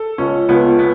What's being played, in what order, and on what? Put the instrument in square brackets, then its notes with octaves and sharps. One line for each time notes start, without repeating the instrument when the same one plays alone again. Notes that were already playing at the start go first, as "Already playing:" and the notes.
Already playing: [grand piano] A4
[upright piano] C#2 [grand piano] C#4
[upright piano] C#2 [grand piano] B3
[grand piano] B3